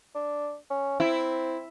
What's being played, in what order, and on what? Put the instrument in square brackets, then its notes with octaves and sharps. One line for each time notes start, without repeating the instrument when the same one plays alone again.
[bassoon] D4
C#4
[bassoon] C4 [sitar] E4